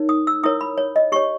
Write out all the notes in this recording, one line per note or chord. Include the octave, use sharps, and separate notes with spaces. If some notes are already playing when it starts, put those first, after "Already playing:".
Already playing: D#4 A#4 C#5
D#6
E6
E4 A#4 C#5 D#6
B5
C#5
D#5
G4 C#5 C#6